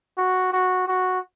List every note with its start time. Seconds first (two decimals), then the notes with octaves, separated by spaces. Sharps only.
0.18 F#4
0.52 F#4
0.88 F#4